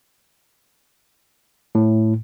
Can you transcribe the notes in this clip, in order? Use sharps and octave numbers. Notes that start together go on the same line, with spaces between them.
A2